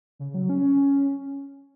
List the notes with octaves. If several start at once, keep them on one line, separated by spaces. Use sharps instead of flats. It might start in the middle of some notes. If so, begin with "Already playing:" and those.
C#3
F#3
C#4